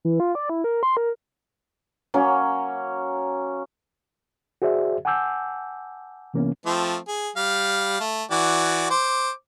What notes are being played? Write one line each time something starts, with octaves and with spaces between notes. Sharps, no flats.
E3
F4
D5
E4
A#4
C6
A#4
F#3 A#3 C#4
F#4 G#4 C5 D5 E5
F#5 G#5 A5 D6 E6 G6
C3 E3 A#3 B3 C#4
F3 A3 C4
G#4
G3 F5
A3
E3 F#4 D5
C5 D6